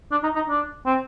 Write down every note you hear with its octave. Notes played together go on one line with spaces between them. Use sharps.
D4
D#4
D#4
D4
C4